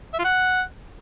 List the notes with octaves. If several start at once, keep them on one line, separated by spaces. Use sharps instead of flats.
E5
F4
F#5